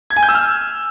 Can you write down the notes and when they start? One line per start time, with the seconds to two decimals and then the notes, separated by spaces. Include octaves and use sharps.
0.10 G#6
0.16 G#5
0.23 G6
0.29 E6
0.35 F6